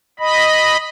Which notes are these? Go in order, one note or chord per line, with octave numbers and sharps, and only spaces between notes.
D#5 B5